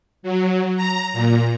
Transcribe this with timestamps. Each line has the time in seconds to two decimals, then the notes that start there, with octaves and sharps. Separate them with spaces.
0.23 F#3
0.76 A#5
1.13 A#2